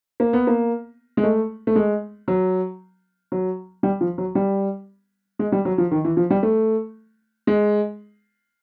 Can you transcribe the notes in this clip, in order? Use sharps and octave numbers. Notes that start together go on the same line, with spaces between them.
A#3
B3
A#3
G#3
A3
A3
G#3
F#3
F#3
G3
F3
F#3
G3
G#3
G3
F#3
F3
D#3
E3
F3
G3
A3
G#3